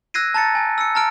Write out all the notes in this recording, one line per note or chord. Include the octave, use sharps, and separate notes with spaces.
E6 F#6 G#6 A#6 C7 D#7
A5 A#5 A6 C#7
G#5
E6 C#7
A5 A#5 F6 D7